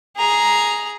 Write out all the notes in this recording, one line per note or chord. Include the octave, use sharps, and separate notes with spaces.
G#4 A#5